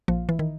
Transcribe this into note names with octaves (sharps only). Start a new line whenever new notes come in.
A#1 F3
E3
D#3